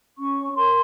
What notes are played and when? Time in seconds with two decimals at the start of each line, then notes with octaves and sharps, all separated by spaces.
0.18 C#4 C#6
0.38 C#5
0.56 A#4 C6